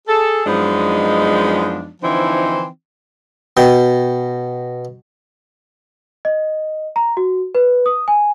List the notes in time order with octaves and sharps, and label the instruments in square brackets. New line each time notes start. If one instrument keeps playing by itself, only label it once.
[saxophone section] G#4 A4
F#2 F3 G#3 B3 D4 D#4
D3 E3 F3 C4 D#4 E4
[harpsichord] B2 G5
[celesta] D#5
A#5
F#4
B4
D#6
G#5